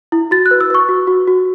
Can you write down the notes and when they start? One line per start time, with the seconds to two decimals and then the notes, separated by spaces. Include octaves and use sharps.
0.12 E4
0.31 F#4 A6
0.46 F#6
0.51 B4
0.61 E6
0.70 B4 C#6
0.89 F#4
1.07 F#4
1.27 F#4